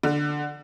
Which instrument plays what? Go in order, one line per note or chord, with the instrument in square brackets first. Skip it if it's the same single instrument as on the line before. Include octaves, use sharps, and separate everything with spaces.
[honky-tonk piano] D3